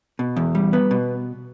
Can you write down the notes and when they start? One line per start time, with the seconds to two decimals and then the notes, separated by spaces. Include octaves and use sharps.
0.19 B2
0.36 E2
0.55 G3
0.73 B3
0.91 B2